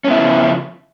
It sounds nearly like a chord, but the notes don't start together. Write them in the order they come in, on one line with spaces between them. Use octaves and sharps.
C#4 B3 E4 C#3 F3